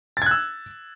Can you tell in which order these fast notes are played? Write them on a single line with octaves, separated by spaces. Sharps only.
A6 G#6 F#6 E6